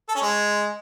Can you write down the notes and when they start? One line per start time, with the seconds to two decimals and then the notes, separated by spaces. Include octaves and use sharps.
0.09 A4
0.15 C#4
0.22 G#3